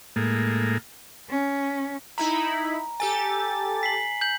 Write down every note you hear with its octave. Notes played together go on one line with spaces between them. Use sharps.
A2 G#3 A#3
C#4
D#4 E4 A#5 B5
G4 A4 G#5 A6
B6 C7 F#7
G6 F#7